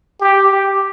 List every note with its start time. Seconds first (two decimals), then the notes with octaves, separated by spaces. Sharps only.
0.21 G4
0.52 G4